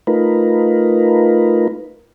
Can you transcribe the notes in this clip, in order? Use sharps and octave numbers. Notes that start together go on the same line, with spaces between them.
A3 D#4 F4 A#4 B4